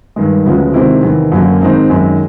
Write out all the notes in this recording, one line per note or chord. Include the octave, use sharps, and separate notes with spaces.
G2 D#3 G#3
D2 C#3 F3 G#3 B3
C3 D#3 G#3 C4 E4
E2 C3 D#3
F#2 D3 F#3 A#3
G#2 D#3 G#3 C4 D#4
F#2 D#3 G#3